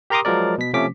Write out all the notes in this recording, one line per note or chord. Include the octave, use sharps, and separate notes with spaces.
G4 A#4 A#5 C6 D6 D#6
F3 F#3 G#3 A#4 D5
B2 B6
C3 F3 A3 C#4 D6 B6